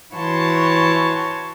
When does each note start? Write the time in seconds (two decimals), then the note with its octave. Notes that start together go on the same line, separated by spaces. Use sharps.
0.14 E3 F#4 C#5 A5 C6